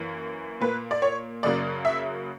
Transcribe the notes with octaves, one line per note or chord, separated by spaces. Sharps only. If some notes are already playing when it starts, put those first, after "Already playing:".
Already playing: F#2 E3 A#3
A#2 A#3 B4
D5
C#5
F#2 C#3 F#3 A#3 D5
E5